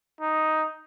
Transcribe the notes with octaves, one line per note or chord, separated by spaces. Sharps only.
D#4